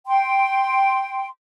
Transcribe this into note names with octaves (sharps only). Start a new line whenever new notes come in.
G5 C6